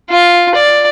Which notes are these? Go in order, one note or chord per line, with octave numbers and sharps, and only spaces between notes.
F4
D5